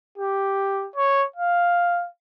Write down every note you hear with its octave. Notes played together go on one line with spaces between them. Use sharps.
G4
C#5
F5